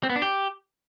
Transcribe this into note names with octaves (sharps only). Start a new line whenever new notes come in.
C4
B3
D4
G4